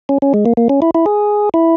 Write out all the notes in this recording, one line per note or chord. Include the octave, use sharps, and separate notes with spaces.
C#4
C#4
G#3
A#3
A#3
C#4
E4
E4
G#4
E4